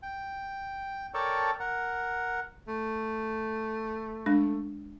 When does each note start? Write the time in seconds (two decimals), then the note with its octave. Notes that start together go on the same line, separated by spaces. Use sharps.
0.03 G5
1.14 A4 A#4 C#5 D5 G5 A5
1.60 A#4 F#5
2.68 A3
4.26 G#3 D4